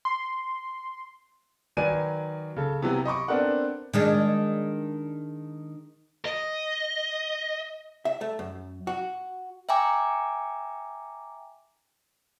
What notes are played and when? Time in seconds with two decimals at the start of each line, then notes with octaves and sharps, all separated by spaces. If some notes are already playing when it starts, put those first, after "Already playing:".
0.05 C6
1.77 D#3 F#3 B4 D5 G#5 D#7
2.56 C#3 A4
2.82 C3 E3 F#3 B3
3.05 D#5 B5 C#6 D6
3.28 B3 C4 D4 A4 A#4 F#5
3.93 D#3 G#3 D4
6.25 D#5
8.05 E5
8.21 A3
8.39 F#2
8.87 F#4
9.69 E5 G5 G#5 A#5 D6